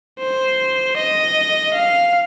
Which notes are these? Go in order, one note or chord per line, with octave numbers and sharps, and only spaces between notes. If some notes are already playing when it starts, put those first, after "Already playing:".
C5
D#5
F5